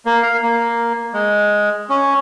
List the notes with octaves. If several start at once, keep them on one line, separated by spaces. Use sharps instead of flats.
A#3
F5
A#3
G#3
C#4